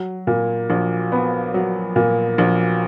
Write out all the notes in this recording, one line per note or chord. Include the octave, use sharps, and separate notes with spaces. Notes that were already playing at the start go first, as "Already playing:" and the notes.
Already playing: F#3
A#2
A#1
B3
F#3
A#2
A#1